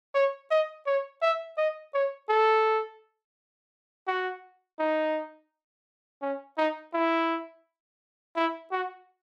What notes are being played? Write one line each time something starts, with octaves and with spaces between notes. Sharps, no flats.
C#5
D#5
C#5
E5
D#5
C#5
A4
F#4
D#4
C#4
D#4
E4
E4
F#4